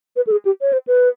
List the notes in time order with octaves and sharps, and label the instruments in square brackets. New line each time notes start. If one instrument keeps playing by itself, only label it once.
[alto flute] B4
A4
G#4
G4
C#5
C5
B4